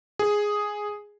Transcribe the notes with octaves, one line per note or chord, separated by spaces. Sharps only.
G#4